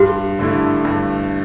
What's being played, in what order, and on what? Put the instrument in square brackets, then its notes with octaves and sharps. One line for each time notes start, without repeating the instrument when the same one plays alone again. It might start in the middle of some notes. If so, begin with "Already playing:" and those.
Already playing: [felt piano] G2 [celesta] G4
[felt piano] D3 A3 E4
G2